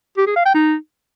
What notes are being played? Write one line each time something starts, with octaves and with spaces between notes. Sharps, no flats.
G4
G#4
F5
G5
D#4